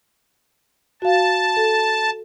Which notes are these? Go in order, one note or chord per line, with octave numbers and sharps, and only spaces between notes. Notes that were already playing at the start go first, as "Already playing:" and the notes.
F#4 F5 A5
A4